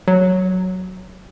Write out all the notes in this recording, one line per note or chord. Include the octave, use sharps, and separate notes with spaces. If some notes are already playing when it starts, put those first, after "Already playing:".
F#3